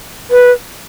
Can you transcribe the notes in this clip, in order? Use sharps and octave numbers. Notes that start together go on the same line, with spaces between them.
B4